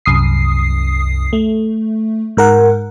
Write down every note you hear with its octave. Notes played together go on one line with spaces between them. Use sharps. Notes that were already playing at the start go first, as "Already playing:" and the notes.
C2 F#2 D#6 C7
A3
G#2 A#4 F#5